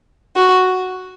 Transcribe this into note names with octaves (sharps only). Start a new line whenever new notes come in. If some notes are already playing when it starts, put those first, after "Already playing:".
F#4